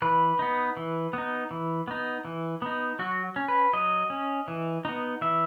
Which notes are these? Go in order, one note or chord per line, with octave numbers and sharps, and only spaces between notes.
E3 B4
B3 D#4
E3
B3 D#4
E3
B3 D#4
E3
B3 D#4
F#3 F#4
C#4
B4
F#3 D#5
C#4
E3
B3 D#4
E3 E5